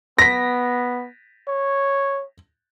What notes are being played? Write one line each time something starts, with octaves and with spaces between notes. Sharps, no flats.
B3 A#6 B6
C#5